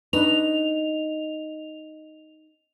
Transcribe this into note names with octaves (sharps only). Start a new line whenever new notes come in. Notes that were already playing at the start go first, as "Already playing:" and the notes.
D4 D#4 B4 C#6 F7